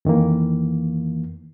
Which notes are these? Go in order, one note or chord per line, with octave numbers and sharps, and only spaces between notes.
F2 D#3 E3 A#3